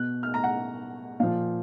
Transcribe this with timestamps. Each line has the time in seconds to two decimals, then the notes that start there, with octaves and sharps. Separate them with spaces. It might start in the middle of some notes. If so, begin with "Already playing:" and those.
Already playing: B2 F#6
0.23 F6
0.34 A#5
0.44 F#5
1.20 A#2 F3 F5